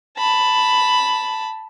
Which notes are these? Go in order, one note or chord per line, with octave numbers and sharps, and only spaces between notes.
A5 B5